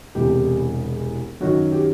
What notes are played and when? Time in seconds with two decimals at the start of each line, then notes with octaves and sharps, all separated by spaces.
0.15 E1 E2 C3 G4
1.41 F#2 D#3 F#3 F#4
1.72 G4